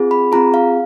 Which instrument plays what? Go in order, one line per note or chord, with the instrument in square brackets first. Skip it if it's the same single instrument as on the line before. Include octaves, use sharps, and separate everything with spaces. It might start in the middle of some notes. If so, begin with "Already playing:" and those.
Already playing: [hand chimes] C4 F4 G#4
B5
C4 F4 G#4 A#5
F5